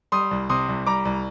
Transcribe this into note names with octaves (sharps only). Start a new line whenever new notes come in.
G3 C6 D#6
C2
C3 C6 D#6
C2
G3 A#5 D6
C2